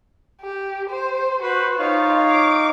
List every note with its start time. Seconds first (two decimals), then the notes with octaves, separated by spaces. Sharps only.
0.41 G4
0.89 C5
1.42 F#4 B4 C5
1.79 D#4 F4 C#5 F5
2.30 D6